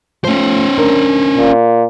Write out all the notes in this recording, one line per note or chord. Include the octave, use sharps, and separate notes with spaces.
F3 A3 C#4 C5
D2 D4 A#4
A#2